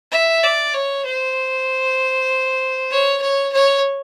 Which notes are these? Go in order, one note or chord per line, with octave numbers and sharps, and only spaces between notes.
E5
D5
C#5
C5
C#5
C#5
C#5